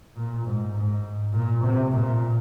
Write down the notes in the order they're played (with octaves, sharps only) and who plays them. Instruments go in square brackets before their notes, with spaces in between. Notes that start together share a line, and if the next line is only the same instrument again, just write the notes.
[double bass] A#2
G#2
G#2
A#2
C3
A#2